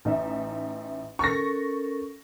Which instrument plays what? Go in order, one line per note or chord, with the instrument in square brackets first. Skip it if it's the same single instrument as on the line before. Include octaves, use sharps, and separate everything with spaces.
[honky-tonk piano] A1 D#4 E5
[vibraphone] C#4 A4 A#4 [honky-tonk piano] C#6 A#6